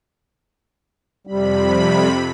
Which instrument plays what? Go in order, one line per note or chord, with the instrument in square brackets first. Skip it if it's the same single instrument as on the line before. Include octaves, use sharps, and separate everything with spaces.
[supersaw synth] F2 C3 B5 [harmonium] G3